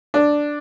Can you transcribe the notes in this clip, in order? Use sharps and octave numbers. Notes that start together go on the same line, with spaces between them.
D4